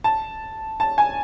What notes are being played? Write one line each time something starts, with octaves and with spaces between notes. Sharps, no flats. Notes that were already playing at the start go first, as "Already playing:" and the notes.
A5
A5
G#5